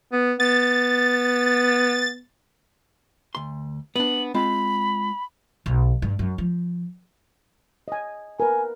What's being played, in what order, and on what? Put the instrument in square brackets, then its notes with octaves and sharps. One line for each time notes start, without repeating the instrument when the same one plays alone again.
[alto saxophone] B3
[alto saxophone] B3 [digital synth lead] A6
[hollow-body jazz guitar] D2 C6
[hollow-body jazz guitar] B3 D4 [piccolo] F#7
[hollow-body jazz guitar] G#3 C4 F4 [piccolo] B5
[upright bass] B1
G2
F#2
F3
[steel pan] D#5 G#5
[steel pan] A#4 B4 [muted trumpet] G#5